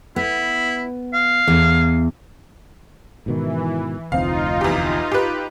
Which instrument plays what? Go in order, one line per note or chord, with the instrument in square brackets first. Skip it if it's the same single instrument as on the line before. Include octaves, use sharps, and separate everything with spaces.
[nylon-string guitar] B3 [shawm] E4
[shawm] F5
[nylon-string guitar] E2
[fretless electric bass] G#2 B2 D#3 [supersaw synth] E3
[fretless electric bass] F1 D2 C4 [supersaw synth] D#4 F4 [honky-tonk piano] F5
[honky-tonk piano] E2 G4
G4 B4